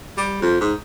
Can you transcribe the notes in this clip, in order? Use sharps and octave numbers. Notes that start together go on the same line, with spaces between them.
G3
F2
G#2